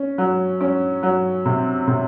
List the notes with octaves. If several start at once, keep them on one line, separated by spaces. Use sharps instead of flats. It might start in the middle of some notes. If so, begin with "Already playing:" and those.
Already playing: C#4
F#3
C#4
F#3
C3
C3